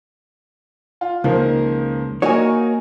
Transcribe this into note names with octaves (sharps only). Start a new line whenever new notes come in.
F4
C#2 D#3 F3 A#3
A#3 D#4 F#4 A#4 C#5 G#5